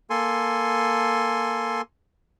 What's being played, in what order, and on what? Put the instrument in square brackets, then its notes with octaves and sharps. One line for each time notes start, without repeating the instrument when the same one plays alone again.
[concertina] A#3 A4 G#5 C6